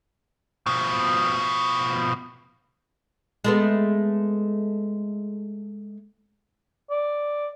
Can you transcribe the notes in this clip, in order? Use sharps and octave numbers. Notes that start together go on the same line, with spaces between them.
B2 F3
G#3 A3 B3
D5